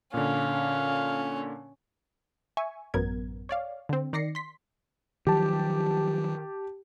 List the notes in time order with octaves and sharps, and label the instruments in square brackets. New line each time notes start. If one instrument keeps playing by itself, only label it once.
[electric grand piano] A#2 D3 [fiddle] C#4 [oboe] F5
[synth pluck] E5 G#5 C#6
A1 F#2 F#3 B3 A#4 G#6
C#5 D5 F5
D3 C4
D#3 D5 A#6 C7 C#7
C6 B6
[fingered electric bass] D#3 F3 F#3 [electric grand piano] G4 A5